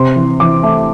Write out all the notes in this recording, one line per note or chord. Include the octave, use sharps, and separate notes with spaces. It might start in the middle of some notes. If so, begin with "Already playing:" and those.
Already playing: C3 C6
E3
E3 D6
A3